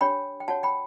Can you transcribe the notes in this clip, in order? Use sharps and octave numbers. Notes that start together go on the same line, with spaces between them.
D4 G4 C#5 G5 B5
G5
F#4 C#5 F#5 A5
G5 B5